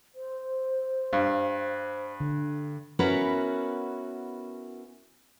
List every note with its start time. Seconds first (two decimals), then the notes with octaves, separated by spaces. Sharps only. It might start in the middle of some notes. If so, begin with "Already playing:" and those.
0.15 C5
1.13 G2 F5
2.20 D3
2.99 B3 C#4 E4 F#4 A#4 B4